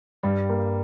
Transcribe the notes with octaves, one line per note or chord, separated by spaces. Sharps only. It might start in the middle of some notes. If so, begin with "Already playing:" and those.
G2 G3
A#3